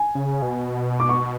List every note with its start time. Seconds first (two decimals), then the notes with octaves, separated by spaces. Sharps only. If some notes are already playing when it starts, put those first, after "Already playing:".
Already playing: G#5
0.15 C#3
0.42 B2
1.00 D6
1.09 C#6